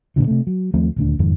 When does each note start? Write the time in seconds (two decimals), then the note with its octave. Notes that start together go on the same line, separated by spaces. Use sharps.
0.16 G2 A#2 D3 E3
0.27 C3 A3
0.47 F#3
0.74 D#2 F3 A3 C4
0.96 D#1 D2 D4
1.19 F#1 F2 G#2 D#3